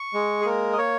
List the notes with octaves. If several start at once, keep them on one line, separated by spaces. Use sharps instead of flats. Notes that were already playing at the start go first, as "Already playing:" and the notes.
Already playing: C#6
G#3
G#4
A#3 A#4
D#5
A#3 C#5